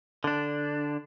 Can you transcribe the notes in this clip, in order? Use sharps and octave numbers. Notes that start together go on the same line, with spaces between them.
D3 D4